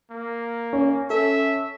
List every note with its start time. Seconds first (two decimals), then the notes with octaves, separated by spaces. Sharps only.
0.10 A#3
0.73 C#4
1.10 A4 E5